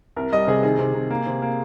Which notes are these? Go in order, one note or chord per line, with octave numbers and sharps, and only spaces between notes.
C2 A#4
G3 D#5
C3 G#4
D#3 G#4
C3
C3
A#3
C3
A#3